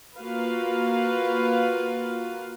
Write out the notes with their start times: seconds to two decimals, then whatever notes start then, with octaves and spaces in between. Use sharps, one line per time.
0.17 A#3 F4 F#4 B4 F5